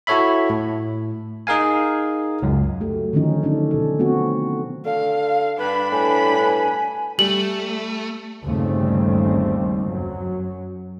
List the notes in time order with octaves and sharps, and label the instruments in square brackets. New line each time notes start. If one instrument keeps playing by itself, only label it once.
[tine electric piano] E4 F#4 A4 C#5 E5 B5
A2
D#4 G#4 A#4 F5 G#5
C#2 F#2
[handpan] F#3 A3 G4
D3 D#3 F3 C#4 D#4
D3 C#4 D4 A4
B2 A4
A3 B3 C4 F#4
[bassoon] D3 [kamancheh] F5
[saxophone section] G2 B4 [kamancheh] D4 B5
[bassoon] A2 [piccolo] G#5
[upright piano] G3 [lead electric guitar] A3 [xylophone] F#7
[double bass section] G1 D#2 C#3 G3 A3 C4
F#2 F#3